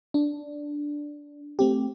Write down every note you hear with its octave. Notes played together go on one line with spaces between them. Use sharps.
D4
A3 C4 G4